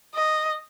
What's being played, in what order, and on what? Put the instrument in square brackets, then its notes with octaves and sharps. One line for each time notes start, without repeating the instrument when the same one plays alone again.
[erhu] D#5